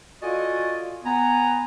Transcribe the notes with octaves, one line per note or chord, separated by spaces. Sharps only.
F4 F#4 A4 D5 D#5 G#5
B3 G#5 A#5